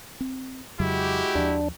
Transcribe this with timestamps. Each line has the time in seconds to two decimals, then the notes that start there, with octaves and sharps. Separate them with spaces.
0.21 C4
0.80 F2 C#3 F#3 G#3 E4 F#4 G4
1.35 D#2 F3 D4